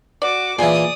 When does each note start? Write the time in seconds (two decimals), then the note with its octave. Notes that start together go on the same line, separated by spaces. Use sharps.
0.22 F#4 D5 D6
0.59 A#2 E3 G#4 D5 G#5 D#6